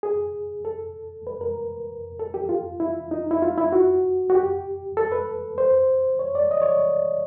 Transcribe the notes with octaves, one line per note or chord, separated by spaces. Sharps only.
G#4
A4
B4
A#4
A4
G4
F4
E4
D#4
E4
F4
E4
F#4
F#4
G4
A4
B4
C5
C#5
D5
D#5
C#5
D5